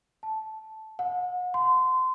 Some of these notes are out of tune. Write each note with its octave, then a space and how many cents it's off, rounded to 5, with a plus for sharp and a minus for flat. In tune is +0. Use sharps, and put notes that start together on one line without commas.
A5 -10
F#5 -40
C6 -25